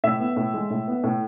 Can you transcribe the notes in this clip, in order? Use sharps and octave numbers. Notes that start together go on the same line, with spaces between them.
A2 E5
B3
A2
G#3
A2
B3
A2